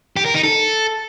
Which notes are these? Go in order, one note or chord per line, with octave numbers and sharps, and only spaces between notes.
G4
A#4
D#4
A4